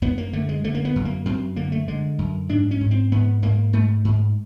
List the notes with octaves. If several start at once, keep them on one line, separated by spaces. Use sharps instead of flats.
F#2 B3
A#3
D3 A3
G#3
D3 A3
A#3
B3
F#2
A#3
F#2 C4
D3 A#3
A3
D3 G#3
F#2
G#2 D4
C#4
G#2
C4
G#2 B3
G#2 A#3
G#2 A3
G#2